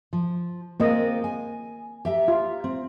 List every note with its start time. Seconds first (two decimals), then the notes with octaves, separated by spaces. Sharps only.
0.13 F3
0.80 G#3 A#3 C4 F4 D#5
1.24 G#5
2.05 G4 E5 A#5
2.28 F4
2.64 C4